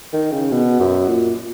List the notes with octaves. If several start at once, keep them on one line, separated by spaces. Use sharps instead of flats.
D#3
C#3
B2
F#2
A#2